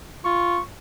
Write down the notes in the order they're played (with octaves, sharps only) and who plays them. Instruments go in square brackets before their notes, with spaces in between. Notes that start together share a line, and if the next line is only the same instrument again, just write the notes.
[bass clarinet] F4 [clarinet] C#6